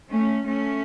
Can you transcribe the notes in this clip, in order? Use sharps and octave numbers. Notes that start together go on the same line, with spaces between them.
A3 C#4
A3 C#4